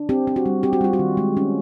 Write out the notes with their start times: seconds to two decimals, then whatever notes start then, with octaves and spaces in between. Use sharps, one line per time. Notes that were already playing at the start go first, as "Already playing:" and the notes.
Already playing: D4
0.09 C4 G4
0.27 C4
0.36 F#4
0.46 G3
0.63 C4 G4
0.73 F#4
0.81 G3 F4
0.93 F#4
0.99 D#3
1.17 G#3
1.37 C#4